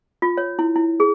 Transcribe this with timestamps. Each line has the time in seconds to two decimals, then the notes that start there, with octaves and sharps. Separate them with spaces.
0.22 F4
0.37 C#5
0.59 E4
0.76 E4
1.00 G#4